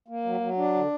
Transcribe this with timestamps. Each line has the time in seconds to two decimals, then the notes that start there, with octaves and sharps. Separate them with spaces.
0.08 A#3
0.25 F#3
0.41 F#3
0.57 D4
0.75 D3